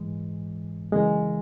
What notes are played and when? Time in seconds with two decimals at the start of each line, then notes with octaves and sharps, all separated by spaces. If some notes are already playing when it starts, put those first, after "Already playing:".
Already playing: G#2 E3 G#3
0.92 F#2 C#3 E3 G#3